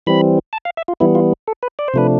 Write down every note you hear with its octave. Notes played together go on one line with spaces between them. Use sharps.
E3 G3 C4 B5
A5
F5
E5
F4
E3 G3 B3 E4
F4
A4
B4
D5
C5
C3 F3 A3 D4 B4